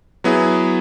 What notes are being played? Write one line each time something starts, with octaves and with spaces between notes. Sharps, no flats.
F#3 B3 E4 G#4